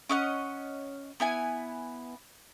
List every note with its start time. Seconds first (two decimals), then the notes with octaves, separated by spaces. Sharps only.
0.09 C#4 D#5 F#5
1.20 B3 E4 G#5